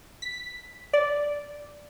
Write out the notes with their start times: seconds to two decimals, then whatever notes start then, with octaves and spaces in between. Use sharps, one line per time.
0.22 B6
0.93 D5